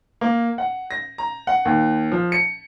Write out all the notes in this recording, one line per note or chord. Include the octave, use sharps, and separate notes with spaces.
A#3
F#5
A#6
A#5
F#5
D#2
F3
C#7